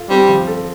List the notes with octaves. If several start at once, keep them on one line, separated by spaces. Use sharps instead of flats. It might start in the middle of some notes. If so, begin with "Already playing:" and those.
Already playing: F4 A4
G3 C4
F3
A4